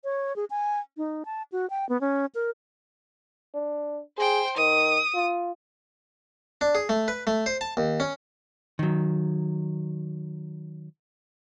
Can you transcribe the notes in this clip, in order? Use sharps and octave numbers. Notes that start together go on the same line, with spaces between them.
C#5
G#4
G#5
D#4
A5
F#4
G5
B3
C#4
A#4
D4
G#4 C5 G5
D#3 D#6
F4
D4
G#4
A3
B4
A3
C5
A5
D#2
C#4
D#3 F#3